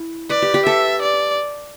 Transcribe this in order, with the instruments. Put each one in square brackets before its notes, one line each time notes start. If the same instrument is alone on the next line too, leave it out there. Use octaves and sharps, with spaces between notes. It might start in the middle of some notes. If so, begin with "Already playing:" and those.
Already playing: [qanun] E4
[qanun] B4 [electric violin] D5
[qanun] G4
G4
[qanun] A4 [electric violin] E5
[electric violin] D5